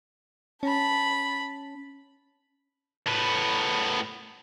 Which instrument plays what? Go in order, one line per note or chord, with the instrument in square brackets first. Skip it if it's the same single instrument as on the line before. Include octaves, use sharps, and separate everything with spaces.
[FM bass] C#4 [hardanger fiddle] A5 B5
[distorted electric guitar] A2 B3